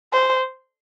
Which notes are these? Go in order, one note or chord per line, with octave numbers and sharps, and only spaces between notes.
C5